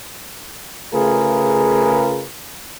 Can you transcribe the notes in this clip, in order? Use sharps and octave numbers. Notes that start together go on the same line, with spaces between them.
C#3 A3 F4 G#4 A#4 B4